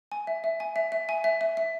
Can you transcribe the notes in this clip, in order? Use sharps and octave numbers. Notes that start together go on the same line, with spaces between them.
G#5
E5
E5
G#5
E5
E5
G#5
E5
E5
E5